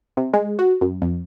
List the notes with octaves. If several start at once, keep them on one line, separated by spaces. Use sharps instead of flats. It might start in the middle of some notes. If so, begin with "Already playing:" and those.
C3
G#3
F#4
F#2
F2